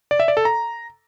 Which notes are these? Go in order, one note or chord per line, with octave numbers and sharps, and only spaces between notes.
D5
E5
D5
A4
A#5